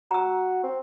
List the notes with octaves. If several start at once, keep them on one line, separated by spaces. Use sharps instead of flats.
F#4 A#5 E6
C4